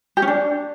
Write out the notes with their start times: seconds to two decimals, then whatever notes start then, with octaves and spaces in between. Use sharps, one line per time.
0.17 G4
0.22 C#4
0.28 D4